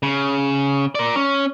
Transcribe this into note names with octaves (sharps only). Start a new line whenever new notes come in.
C#3
A#4 D5
C#4